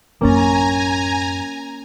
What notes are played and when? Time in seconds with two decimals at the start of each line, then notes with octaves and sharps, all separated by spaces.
0.21 A1 F#2 A#3 C#4 G#5 A#5 A6